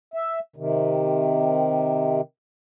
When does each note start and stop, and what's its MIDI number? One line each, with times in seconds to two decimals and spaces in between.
0.14 0.40 76
0.56 2.21 48
0.56 2.21 51